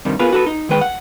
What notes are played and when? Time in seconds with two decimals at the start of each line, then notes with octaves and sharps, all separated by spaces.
0.05 G2 C3 D#3 G3
0.19 B3 F4 G#4 A#4 B4
0.32 F#4 A4 B4
0.46 D#4
0.69 D#3 G#3 B4 G5
0.81 F#5